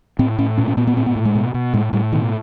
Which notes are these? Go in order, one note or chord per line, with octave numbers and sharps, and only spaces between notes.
A2 C4
A2 C#4
A#2 C#4
C#4
A#2 B3
B3
A2 C4
B3
A2
G#3
B2
B2
A2 G#3
A2 G3
B2 D#3